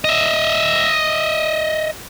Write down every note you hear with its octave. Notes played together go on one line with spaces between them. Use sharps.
D#5 E5